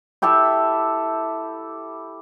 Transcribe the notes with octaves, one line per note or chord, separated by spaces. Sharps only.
E4 G4 A4 E5